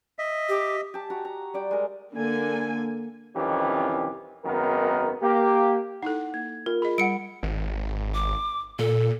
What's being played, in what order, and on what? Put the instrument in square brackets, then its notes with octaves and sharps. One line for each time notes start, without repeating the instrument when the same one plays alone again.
[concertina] D#5 E5
[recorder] G4
[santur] G4 A5
F#4 A#5
A#5
G3 D5 G5
G#3 A#4
[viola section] D3 A#3 A4 G#5
[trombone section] C2 F2 D#3 E3 C#4 G4
G#1 F#2 D#3 B3 A#4
A#3 G4
[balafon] D#4 E4 A4 [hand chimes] F#5
[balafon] A#3 [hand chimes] G#6
[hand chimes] F4 [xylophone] A#4
[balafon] G#4 D#5 [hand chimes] B5
[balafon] G3 [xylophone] F#5 C#7 D7
[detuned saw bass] G#1
[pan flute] D6
[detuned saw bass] A#2 [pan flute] A4